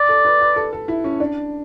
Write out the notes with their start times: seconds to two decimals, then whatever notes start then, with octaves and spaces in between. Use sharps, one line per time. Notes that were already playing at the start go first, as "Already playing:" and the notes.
Already playing: D5
0.09 A4
0.25 B4
0.41 B4
0.56 A4
0.73 A4
0.88 E4
1.04 C#4
1.20 D4